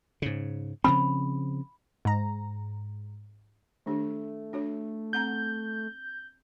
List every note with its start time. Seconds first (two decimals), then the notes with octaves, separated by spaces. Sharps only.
0.22 G#2 C#3
0.84 C#3 F3 C4 B5
2.05 G#2 A#5
3.86 D#3 A3 D4 G4
4.53 D4 F#4 C#5
5.13 C4 F#5 A#5 G6